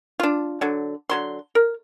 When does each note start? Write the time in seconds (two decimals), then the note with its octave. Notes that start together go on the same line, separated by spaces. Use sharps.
0.20 D4 F4
0.61 D3 F#3
1.09 D3 F#3 C6
1.55 A#4